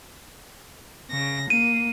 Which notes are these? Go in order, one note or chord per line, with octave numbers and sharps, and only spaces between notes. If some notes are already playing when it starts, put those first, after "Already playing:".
C#3 A#6
A#3 D#7